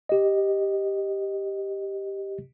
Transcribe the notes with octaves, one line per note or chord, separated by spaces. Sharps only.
G4 D#5